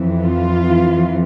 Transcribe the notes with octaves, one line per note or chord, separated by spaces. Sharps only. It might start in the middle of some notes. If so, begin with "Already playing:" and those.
Already playing: F2 E3
F4